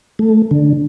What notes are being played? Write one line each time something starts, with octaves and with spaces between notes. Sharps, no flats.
A3
D3